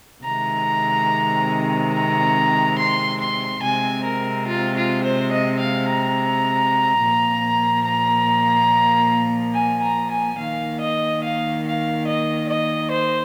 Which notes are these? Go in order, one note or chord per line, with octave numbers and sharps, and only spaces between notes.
C3 D#3 G#3 C4 A#5
A#5
C6
C6
C3 G#3 C4 G#5
A#4
F4
F4
C5
D#5
F5
A#5
A#2 F3 A#3
A#5
G#5
A#5
G#5
D#3 A#3 F5
D#5
F5
F5
D#5
D#5
C5